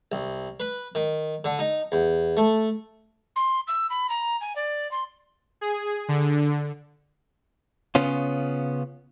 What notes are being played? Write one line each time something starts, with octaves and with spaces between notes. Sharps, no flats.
C2
B4
D#3
D3
D#4
E2
A3
C6
E6
B5
A#5
G#5
D5
C6
G#4
D3
C#3 B3 C#4 F4